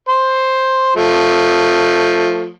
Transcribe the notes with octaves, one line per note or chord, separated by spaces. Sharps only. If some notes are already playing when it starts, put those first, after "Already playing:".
C5
F3 A3